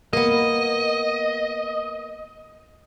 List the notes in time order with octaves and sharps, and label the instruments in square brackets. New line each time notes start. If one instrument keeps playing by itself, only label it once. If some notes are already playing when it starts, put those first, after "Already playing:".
[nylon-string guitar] A#3 B3 [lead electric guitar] D#5